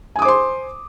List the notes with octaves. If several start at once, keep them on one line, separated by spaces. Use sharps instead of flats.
C5 G#5 C6 D6 D#6